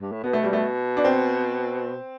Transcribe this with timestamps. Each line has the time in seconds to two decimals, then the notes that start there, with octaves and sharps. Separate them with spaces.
0.01 G2
0.12 A2
0.24 B2 B3
0.33 A3
0.43 G3
0.53 A3
0.97 D4
1.05 C4